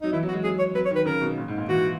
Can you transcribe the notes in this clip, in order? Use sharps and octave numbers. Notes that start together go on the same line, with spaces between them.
F#3 D#4
E3 E4
F#3
F#4
G#3
F#3 G#4
C#5
F#3 B4
C#5
D#3
B4
C#3 A#4
B2
A#2
G#2
A#2
E3 F#4